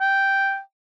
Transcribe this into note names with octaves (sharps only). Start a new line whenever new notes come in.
G5